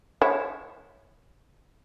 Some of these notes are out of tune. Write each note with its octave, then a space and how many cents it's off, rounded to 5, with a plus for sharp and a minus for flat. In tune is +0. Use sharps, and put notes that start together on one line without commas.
E4 +0 C#5 +0